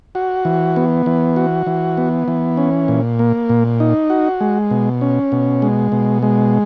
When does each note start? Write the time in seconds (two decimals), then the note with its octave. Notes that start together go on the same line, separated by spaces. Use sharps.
0.15 F#4
0.45 E3
0.76 B3
1.06 E3
1.36 F#4
1.67 E3
1.97 B3
2.28 E3
2.57 C#4
2.88 A#2
3.19 A#3
3.49 A#2
3.80 D#4
4.10 F#4
4.41 G#3
4.71 B2
5.01 C#4
5.32 B2
5.62 G#3
5.92 B2
6.23 G#3